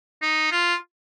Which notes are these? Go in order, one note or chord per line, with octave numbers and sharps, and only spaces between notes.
D#4
F4